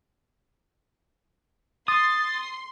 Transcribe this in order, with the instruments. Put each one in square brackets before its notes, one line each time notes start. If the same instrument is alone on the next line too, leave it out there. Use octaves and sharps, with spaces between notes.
[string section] C6 [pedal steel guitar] D#6 [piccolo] A6